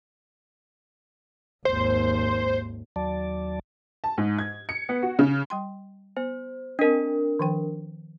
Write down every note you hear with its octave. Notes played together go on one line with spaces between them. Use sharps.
G#1 D#2 C5
D#2 F#3 D5 A5
A5
G#2
G#6
C#7
B3
F#4
C#3
G3 G5 C6
B3 C5
C4 D4 A#4 D#5
D#3 F3 G5